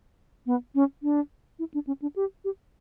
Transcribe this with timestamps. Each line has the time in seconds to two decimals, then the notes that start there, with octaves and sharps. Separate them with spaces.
0.46 B3
0.75 C#4
1.03 D4
1.59 E4
1.74 D4
1.87 C#4
2.02 D4
2.16 G4
2.45 G4